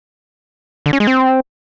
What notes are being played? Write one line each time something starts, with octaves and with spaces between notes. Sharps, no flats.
D3
C#4
G#3
C4